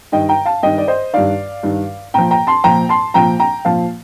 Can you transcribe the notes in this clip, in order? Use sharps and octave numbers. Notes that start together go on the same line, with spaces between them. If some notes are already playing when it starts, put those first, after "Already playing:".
G2 D#3 D#5 G5
G5 A#5
F5 A5
G2 D#3 D#5 G5
D5
C5 D#5
G2 D#3 D5 F5
G2 D#3
A#2 F3 G5 A#5
G5 A#5
A5 C6
A#2 F3 G5 A#5
A5 C6
A#2 F3 G5 A#5
G5 A#5
A#2 F3 F5 A5